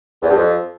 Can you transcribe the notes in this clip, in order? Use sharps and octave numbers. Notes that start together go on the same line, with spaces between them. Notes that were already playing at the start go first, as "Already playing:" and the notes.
E2
G2
F2